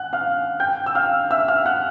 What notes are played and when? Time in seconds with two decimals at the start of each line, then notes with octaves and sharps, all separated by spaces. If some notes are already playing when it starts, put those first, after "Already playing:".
Already playing: F#5 F#6
0.13 F5 F6
0.60 G5 G6
0.86 E6
0.95 F5 F6
1.31 E5 E6
1.48 F5 F6
1.66 F#5 F#6